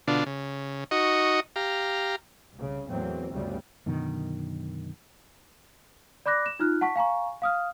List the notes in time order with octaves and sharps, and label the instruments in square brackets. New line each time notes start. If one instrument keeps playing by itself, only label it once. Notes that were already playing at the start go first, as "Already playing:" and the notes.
[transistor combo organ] B2 D3 D4 F4
C#3
D#4 F#4 D#5 C#6
G4 F5 A#5
[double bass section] C2 C#3
E2 A2 F#3 A#3 C4
G1 D2 C#3 G3
[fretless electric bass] F#2 B2 D3 D#3
[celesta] D5 B5 D6 F#6 A#6
E7
D#4 F4 F6 F#6
F#5 A5 C#6 B6
F5 G#5 A#5 C#6
F5 D#6 F6